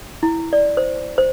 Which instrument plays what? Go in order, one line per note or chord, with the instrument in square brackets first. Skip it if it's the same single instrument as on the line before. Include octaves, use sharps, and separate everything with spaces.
[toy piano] E4
D5
C5
C5